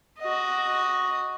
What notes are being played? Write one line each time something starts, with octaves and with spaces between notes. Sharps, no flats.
F#4 D#5